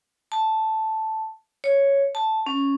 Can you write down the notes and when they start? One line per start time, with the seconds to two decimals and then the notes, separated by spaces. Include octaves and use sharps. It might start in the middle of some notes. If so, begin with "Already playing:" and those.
0.32 A5
1.64 C#5
2.15 A5
2.47 C#4